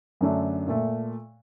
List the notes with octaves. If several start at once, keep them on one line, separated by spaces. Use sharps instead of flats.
F#2 D3 A3 D4
A#2 A3